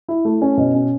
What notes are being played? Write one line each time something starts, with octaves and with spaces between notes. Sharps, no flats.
E4
A3
C#4
B2
C#4